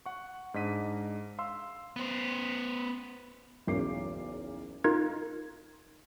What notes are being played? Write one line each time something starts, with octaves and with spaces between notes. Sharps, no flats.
F#5 C#6
G#2 D4 D#5 B6 D#7
F5 C6 E6
B3 C5
F#1 B1 E2 A#4 D6 C7
D#4 F4 A#4 G#6